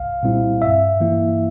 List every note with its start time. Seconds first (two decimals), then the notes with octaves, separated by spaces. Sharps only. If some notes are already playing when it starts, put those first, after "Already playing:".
Already playing: C2 F5
0.23 A#2 G3 C4 E4
0.62 G2 E5
1.00 E3 A#3 E4